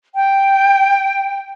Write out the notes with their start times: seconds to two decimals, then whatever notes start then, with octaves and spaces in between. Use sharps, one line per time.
0.15 G5